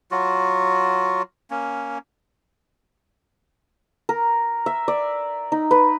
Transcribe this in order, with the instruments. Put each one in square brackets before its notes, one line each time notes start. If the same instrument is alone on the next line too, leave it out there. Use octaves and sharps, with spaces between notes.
[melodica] F#3 F4 F#4
A#3 C#4
[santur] A#4
E5
D5
D#4
B4